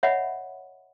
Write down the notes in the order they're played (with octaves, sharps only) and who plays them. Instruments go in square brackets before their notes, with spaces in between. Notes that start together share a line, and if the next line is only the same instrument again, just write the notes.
[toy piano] C#5 D#5 E5 F#5 B5